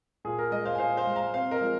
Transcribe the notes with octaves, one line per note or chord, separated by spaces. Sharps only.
A#2 G#4
A#4
G#3 A#4 D#5
C5 F5
G#5
A#2 C5 F5
C5 F5
G#3
F5 A#5
C3 C5 F5
A#4 D#5
F3 G#3